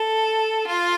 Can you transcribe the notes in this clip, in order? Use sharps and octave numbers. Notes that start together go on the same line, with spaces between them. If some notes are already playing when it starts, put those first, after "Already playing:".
Already playing: A4
F4